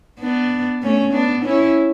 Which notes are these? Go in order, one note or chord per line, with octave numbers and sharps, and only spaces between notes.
B3 D4
A3 C#4
B3 D4
C#4 E4